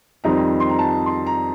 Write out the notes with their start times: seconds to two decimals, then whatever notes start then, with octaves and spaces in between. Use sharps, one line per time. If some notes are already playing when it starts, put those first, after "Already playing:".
0.24 F2 D#3 G3 C4 D#4 A#5
0.60 C6
0.70 A#5
0.79 A5
1.06 C6
1.26 A#5